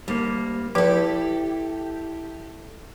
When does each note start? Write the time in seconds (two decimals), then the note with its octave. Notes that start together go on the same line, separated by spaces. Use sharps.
0.08 D2 G3 A#3
0.75 F3 E4 G4 A4 B4